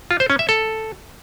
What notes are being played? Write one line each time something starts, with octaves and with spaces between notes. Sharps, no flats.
F4
C5
C#4
E5
A4